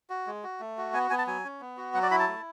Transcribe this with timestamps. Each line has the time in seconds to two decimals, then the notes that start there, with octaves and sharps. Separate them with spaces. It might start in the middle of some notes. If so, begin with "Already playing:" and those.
0.10 F#4
0.27 G#3
0.43 F#4
0.60 A3
0.78 F#4
0.93 B3 G#5
1.10 B3 G#5
1.18 A5
1.27 F#3 G#5
1.44 C#4
1.61 B3
1.77 F#4
1.94 F#3 F#5
2.03 D5
2.11 E4 B5
2.19 A5
2.28 A3